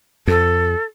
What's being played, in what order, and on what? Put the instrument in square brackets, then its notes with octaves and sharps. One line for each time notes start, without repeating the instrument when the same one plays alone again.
[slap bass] F2 [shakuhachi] A4